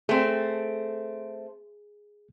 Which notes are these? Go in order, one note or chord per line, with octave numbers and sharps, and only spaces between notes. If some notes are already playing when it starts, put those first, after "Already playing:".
A3 C4 G#4